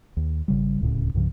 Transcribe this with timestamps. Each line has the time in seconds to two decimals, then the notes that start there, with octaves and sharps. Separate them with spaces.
0.17 D#2
0.48 G#1 C#3 G3
0.81 D1 C#2 A2 C#3
1.14 C2 G2 C#3 F3